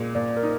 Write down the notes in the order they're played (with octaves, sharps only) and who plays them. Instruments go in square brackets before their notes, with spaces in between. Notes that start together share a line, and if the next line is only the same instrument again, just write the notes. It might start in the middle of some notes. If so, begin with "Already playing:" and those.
Already playing: [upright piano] A#2 G#3
[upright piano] A#2 [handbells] D5
[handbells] A#4
[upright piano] D#4